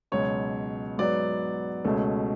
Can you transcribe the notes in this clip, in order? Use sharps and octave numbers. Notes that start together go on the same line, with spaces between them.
C#2 B2 F#3 C#4 C#5
G#2 F#3 B3 D5
C#2 B2 A3 C#4